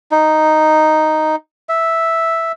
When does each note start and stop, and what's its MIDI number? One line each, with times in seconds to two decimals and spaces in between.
0.11 1.36 63
1.69 2.52 76